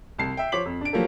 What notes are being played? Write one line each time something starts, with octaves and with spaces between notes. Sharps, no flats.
C2 A5 C7
E5 G5
F3 C5 C#5 D6 B6 F#7
F2
D4 D7
F3 F#3 A#3 G4 A4